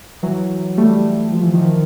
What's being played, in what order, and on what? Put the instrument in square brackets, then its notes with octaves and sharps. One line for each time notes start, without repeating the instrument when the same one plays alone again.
[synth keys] E3 F#3
G3 A3
F3
E3
D#3 F3